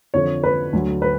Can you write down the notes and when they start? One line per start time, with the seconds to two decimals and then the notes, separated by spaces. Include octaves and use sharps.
0.14 F2 D3 F3 C#5
0.44 B4
0.73 D2 D3 F#3
1.02 B4